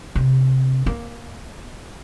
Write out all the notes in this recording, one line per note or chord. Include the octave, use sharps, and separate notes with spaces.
C3
A#3